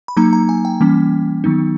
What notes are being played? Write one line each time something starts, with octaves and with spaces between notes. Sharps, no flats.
B5
F#3 A#3 D#4 A#5
A#5
G#5
G5
E3 G3 A#3 C#4
D#3 F#3 B3 D#4